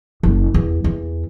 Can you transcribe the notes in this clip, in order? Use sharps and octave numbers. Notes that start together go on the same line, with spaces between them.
F#1
E2
E2